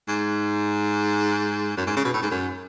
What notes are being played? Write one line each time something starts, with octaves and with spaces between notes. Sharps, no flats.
G#2
F#2
G#2
C#3
B2
A2
G#2
F#2